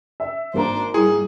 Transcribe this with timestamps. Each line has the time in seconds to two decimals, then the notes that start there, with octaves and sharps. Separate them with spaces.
0.20 E5
0.54 G#1 A#3 D4 C5 A#5
0.94 G3 E4 G#4